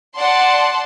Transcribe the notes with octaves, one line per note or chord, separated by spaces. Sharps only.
D5 F#5 A5 C6